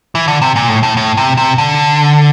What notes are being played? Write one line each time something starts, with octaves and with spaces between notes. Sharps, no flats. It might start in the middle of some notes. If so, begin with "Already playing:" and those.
E3
D3
C3
A#2
A2
A2
A2
C3
C3
D3